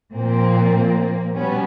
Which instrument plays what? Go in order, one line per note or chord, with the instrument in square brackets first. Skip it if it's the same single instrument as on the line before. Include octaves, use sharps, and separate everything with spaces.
[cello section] A#2 F3 A#3 C4
B2 G3 B3 C#4